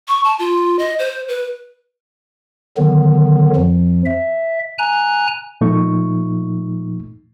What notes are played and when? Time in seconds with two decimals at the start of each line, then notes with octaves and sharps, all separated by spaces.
0.08 C#6
0.24 A5
0.39 F4
0.79 D#5
0.99 C5
1.28 B4
2.77 D3 D#3 F#3 B3
3.56 F2 F3
4.06 E5
4.79 G#5 A#5 F#6
5.61 A#2 F3 A3 D#4 C#6